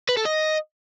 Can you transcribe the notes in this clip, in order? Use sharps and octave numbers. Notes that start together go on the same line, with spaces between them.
B4
A4
D#5